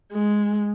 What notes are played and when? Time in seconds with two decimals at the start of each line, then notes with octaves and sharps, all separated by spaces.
0.12 G#3